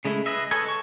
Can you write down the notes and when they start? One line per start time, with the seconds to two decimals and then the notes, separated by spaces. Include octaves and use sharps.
0.05 C#3 G#3 A3 E4
0.26 G#4 B4 D#5 E5
0.51 A4 B4 C#5 D#5 G#5
0.66 A4 C#6